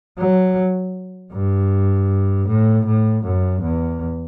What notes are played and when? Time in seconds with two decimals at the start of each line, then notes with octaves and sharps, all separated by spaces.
0.18 F#3
1.32 G2
2.48 A2
2.86 A2
3.24 F#2
3.62 E2